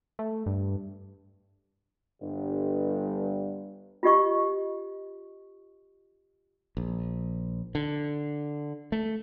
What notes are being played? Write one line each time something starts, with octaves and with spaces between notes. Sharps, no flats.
A3
G2
G1 G2
F4 G4 D#5 C#6
A#1
D3
A3